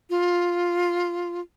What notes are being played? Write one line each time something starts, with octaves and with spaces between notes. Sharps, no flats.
F4